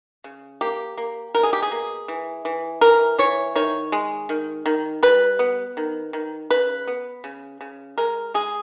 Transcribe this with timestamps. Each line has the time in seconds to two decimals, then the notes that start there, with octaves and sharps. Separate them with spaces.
0.24 C#3
0.61 A#3 G4
0.98 A#3
1.35 B2 A#4
1.43 G#4
1.53 G4
1.62 G#4
1.72 A#3
2.08 E3
2.45 E3
2.81 E3 A#4
3.18 E3 C#5
3.56 D#3 C#5
3.92 G#3
4.29 D#3
4.66 D#3
5.03 G3 B4
5.39 B3
5.77 D#3
6.13 D#3
6.50 C#3 B4
6.87 B3
7.24 C#3
7.61 C#3
7.98 G#3 A#4
8.34 G#3 G#4